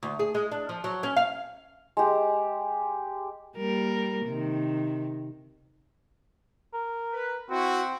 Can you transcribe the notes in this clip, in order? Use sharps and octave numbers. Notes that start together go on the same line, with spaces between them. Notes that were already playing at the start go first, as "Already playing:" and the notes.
D2
G#4
G#3
D4
F3
F#3
C#4
F5
G#3 G4
G3 A#3 A#4
C3 D#3
A#4
B4
C4 E4 F#4